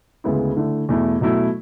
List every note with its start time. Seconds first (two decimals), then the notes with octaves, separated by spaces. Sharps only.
0.24 D2 C#3 G#3 B3 E4
0.57 D3 A3 E4
0.89 E2 B2 A3 E4
1.21 B2 F#3 A3 E4